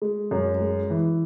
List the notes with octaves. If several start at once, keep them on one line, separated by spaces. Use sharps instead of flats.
G#3
F#2
G#3
E3